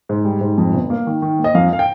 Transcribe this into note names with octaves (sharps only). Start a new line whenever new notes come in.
G#2
G3
G#2
F2
G1
A#3
D#3
D#3
A#3
D#5
F2 F5
F5
G5